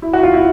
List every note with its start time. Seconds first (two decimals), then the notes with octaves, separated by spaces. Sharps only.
0.02 E4
0.13 F#4
0.23 F4
0.33 E4